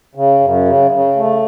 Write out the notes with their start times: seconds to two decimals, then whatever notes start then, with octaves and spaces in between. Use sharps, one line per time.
0.15 C#3
0.40 F#2
0.65 C#3
0.91 C#3
1.16 A3